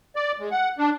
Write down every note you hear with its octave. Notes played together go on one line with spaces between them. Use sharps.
D5
G#3
F#5
D4